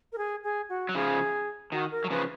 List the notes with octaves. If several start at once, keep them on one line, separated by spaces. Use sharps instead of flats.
A#4
G#4
G#4
F#4
F#3
C#3 F3 G#4
D#3 F#4
A#4
F#3
C#3 F3 B4